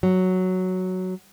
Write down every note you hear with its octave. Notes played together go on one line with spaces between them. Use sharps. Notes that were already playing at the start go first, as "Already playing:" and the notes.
F#3